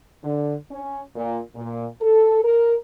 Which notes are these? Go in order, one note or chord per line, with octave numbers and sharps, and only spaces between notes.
D3
C#4
A#2
A#2
A4
A#4